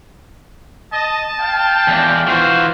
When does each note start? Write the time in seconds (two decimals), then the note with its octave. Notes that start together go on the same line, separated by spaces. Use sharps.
0.93 D#5 A5
1.40 F5 G5
1.88 E2 D4
2.28 E3 F4 F#4 C5